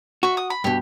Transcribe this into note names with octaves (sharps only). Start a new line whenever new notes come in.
F#4 E5 C#6
D#6
B5
G2 B2 G4